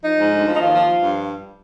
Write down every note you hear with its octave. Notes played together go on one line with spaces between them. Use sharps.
F3 D#4
G#2
D2
F3
D#4
D#2 F4
F3
F3
G2